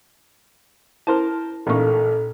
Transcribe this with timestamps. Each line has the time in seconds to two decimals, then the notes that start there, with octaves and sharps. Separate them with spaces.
1.07 E4 A#4 C5 A5
1.67 A1 A#2 A#3 D#4 A4 C#6